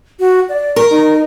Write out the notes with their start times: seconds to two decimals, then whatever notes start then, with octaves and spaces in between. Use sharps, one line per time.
0.19 F#4
0.49 D5
0.76 A#4 C#6
0.90 D#4